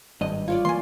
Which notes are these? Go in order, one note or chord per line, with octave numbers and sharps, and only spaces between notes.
G#1 G2 D#5
F4 C#5 D5
E3 G3 A#3 G#5 C6